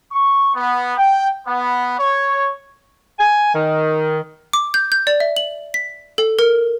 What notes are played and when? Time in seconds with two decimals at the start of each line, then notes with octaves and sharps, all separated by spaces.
0.12 C#6
0.55 B3
0.98 G5
1.48 B3
1.99 C#5
3.19 G#5
3.54 D#3
4.53 D6
4.74 G6
4.92 G6
5.07 D5
5.20 E5
5.37 F#7
5.74 B6
6.18 A4
6.39 A#4